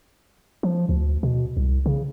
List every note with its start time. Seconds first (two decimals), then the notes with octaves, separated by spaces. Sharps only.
0.63 F3
0.89 D2
1.23 B2
1.57 C2
1.86 C#3